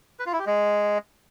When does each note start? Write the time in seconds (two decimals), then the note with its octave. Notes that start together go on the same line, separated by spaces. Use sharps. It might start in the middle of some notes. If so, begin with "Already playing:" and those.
0.19 B4
0.26 F4
0.33 E4
0.39 G4
0.46 G#3